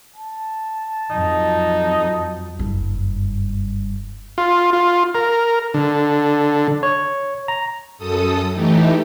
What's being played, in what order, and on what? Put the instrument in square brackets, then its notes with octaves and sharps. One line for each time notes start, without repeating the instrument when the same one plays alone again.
[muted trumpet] A5
[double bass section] F2 F#3 [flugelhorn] D#4
[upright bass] F#1 G2
[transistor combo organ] F4
F4
A#4
D3
[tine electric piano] C#5
A#5
[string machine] F#2 A4 D#6
E3 A3 D#4 G4